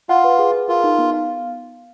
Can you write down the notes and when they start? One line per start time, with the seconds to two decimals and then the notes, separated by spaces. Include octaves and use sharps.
0.09 F4 F#5
0.24 B4
0.39 G#4
0.54 G#4
0.69 F4 A#4
0.84 D#4
0.98 B3
1.14 F5